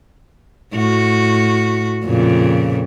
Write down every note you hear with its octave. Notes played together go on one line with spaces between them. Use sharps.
A2 F#4
F2 A#2 C#3